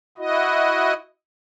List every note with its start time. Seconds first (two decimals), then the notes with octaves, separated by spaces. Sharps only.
0.18 E4 F#4 D#5